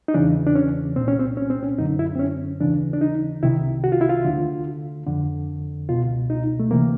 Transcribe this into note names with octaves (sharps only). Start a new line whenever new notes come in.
D#4
E2 C#3 E3 D4
D4
C#4
C2 A#2 C4
C#4
C4
C#4
C4
C#4
F#2 D3 D#4
E4
C4
C#4
D#2 C#3 E3 D4
D4
D#4
C2 C3 D#3 E4
F#4
F4
E4
F4
D2 D3
F2 D3
C#2 B2 F4
D#4
A3
D2 C3 E3 A#3